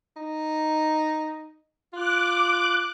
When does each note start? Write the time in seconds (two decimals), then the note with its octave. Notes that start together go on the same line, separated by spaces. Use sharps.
0.17 D#4
1.93 F4 D6 F#6